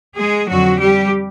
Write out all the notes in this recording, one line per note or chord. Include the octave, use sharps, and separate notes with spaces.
G#3 G#4
F2 D3 F3 F#3 F#4
G3 G4